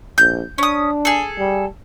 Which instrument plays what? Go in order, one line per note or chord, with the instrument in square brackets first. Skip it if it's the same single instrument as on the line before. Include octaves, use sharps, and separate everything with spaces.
[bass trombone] A#1 [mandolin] G6
[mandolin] C#4 D#6 [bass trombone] D4
[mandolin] G#4 A4
[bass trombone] G3